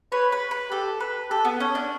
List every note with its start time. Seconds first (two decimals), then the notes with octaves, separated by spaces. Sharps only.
0.12 B4 C#5
0.32 B4
0.51 B4
0.71 G4 A4
1.00 B4
1.30 G4 A4
1.45 B3
1.60 C#4 C#5
1.75 D4